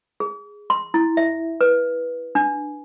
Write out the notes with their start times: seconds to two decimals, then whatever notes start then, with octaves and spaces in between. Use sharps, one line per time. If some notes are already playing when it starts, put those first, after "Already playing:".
0.20 G#4
0.70 C6
0.94 E4
1.17 E5
1.61 B4
2.35 D4